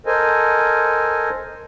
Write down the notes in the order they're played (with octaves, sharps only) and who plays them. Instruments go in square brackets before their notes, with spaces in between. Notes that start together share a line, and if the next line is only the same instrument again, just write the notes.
[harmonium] A4 A#4 C5 D#5 G#5